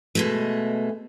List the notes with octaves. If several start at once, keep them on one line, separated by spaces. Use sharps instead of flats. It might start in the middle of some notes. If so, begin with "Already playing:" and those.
B2 G#3 A3